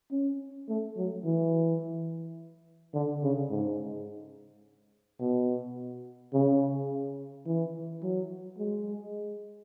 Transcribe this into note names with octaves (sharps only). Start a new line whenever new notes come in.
C#4
A3
F#3
E3
D3
C#3
G#2
B2
C#3
E3
F#3
G#3